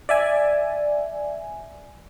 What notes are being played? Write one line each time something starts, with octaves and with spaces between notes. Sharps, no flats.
D5 E5 G#5